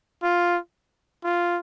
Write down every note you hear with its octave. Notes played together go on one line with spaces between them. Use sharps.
F4
F4